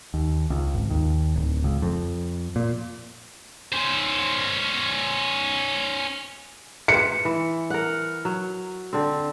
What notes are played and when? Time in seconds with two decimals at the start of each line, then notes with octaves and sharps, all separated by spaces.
0.14 D#2
0.50 C#2
0.75 G#1
0.90 D#2
1.36 D1
1.64 C#2
1.82 F2
2.56 A#2
3.73 C#4 C5
6.88 B4 C5 F#5 C#7
7.25 E3
7.70 A#4 F#5
8.25 F#3
8.93 D3 C4